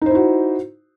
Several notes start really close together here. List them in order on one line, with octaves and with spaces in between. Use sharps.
D#4 C5 E4 F#4